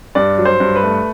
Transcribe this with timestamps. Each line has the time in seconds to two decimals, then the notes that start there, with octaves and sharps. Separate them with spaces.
0.15 G2 D5
0.38 F#3
0.45 C5
0.60 G2
0.75 B4
0.83 A3